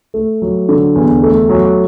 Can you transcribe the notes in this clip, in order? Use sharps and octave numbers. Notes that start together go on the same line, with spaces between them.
A3
F#3
D3
E2
A3
F#3